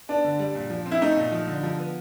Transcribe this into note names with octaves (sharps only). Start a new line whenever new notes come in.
B3 D4
D3
G3
A#2
F3
C4
E4
A3 D#4
A#2
F3
D3
F3
B3